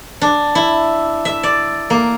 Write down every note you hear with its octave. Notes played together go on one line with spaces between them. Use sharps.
D4
E4
E5
D5
A#3